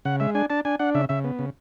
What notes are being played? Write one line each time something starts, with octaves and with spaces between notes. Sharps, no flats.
C#3 F#5
G#3 E5
D4 G#5
D4 A5
D4 G#5
D4 F#5
C#3 E5
C#3 E5
B3
C#3